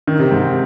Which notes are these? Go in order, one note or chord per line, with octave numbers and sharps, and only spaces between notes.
D#3
C3
G#2